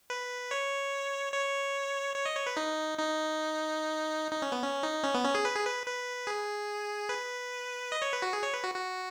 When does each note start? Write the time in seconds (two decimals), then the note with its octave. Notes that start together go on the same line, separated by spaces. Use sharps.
0.10 B4
0.51 C#5
1.33 C#5
2.16 C#5
2.26 D#5
2.37 C#5
2.47 B4
2.57 D#4
2.98 D#4
4.32 D#4
4.42 C#4
4.52 B3
4.63 C#4
4.83 D#4
5.03 C#4
5.14 B3
5.24 C#4
5.35 G#4
5.45 B4
5.55 G#4
5.66 B4
5.86 B4
6.27 G#4
7.09 B4
7.92 D#5
8.02 C#5
8.13 B4
8.22 F#4
8.33 G#4
8.43 C#5
8.54 B4
8.64 F#4
8.74 F#4